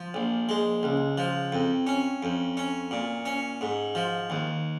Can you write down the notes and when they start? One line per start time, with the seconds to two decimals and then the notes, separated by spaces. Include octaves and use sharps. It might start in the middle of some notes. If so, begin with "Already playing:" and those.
Already playing: F3
0.14 A#1
0.49 G#3
0.83 C#2
1.18 F3
1.52 F2
1.87 C#4
2.23 F2
2.57 C#4
2.91 A#2
3.26 C#4
3.61 G#2
3.95 F3
4.30 D#2